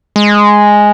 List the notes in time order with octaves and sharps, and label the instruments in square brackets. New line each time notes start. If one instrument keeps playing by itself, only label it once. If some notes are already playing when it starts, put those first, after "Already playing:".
[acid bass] G#3